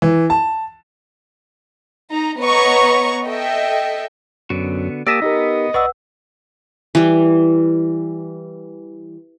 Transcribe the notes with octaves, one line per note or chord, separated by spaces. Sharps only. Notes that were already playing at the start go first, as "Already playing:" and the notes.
E3
A5
D#4 A#5
B3 B4 C#5 D#5 A#5 C#6
A4 D#5 E5 G5
F#2 D3 B3 F#4
A#3 G4 D5 A5 D#6 E6 A#6 B6
B3 D#4 G4 A#4 D#5
B1 B4 D5 F#5 B5 C#6 E6
E3 G3